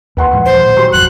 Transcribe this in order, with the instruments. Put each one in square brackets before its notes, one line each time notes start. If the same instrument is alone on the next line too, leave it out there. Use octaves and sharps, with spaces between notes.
[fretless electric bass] D#2 [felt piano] B4 F#5 C6
[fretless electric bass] A2 F3 G#3
[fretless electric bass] F3 [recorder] C5
[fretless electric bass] A#2 D#3
[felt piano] F#3 G4 C6
[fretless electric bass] G1 F2 [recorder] F#6